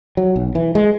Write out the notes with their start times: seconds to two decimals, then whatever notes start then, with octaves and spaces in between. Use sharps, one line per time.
0.17 F#3
0.36 B1
0.55 E3
0.75 G#3